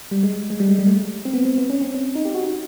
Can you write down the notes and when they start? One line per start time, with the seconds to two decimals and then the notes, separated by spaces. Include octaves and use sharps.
0.11 G3
0.23 G#3
0.50 G#3
0.60 G3
0.68 G#3
0.79 G3
0.87 A3
1.25 C4
1.33 B3
1.45 C4
1.58 B3
1.70 C#4
1.81 C4
1.94 C#4
2.15 D#4
2.25 G4
2.35 F#4
2.43 D#4